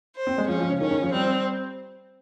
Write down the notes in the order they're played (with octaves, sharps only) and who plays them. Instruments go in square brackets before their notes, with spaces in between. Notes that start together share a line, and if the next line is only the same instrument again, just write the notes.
[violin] C5
[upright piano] C4
G#3
[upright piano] F3 [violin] C#4
[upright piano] F3
C#3
[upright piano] D#3 [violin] C#4
[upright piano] D#3
F3
[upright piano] G3 [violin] C4